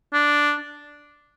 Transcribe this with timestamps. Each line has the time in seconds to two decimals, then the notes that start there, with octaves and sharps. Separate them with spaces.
0.13 D4